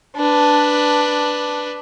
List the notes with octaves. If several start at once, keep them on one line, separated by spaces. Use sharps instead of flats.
D4 B4